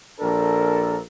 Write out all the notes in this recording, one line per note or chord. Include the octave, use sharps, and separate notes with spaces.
A#1 D4 A4 A#4